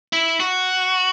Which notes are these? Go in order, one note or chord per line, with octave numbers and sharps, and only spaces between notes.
E4
F#4